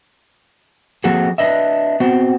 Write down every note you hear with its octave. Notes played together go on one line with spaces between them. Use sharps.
F3 A#3 C4 F#4 G#4 A4
D4 B4 D#5 E5
B3 C4 F#4